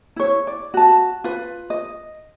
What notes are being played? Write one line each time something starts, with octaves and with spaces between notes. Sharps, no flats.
E4 C#5
D5
F#4 A5
F4 B4
D#5